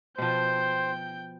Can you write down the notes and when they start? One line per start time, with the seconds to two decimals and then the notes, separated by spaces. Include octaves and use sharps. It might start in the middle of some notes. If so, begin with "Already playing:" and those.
0.18 B2 F3 C5 G5 G6